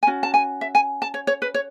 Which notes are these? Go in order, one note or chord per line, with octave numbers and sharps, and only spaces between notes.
G#5
C#4 F#4
A5
G#5
E5
G#5
A5
C#5
C#5
B4
C#5